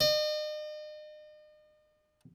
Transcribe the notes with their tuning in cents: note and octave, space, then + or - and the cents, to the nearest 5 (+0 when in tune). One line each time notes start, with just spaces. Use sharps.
D#5 -40